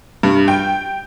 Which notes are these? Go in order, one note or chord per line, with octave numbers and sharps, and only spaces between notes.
G2
G5